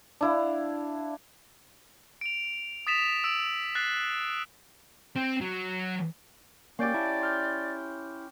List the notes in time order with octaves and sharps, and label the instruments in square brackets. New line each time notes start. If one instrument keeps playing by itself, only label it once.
[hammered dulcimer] D4 E4 F5
[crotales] D7 F7
D#6 A6 B6 E7 F7
E6 D7
F#6 A6 C7
[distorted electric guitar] C4
F#3
[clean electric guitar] A#3 [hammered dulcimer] C#4 G4 [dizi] D5 [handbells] F5 G6 D7
[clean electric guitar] E4 [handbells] A5
[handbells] C6 F6 G6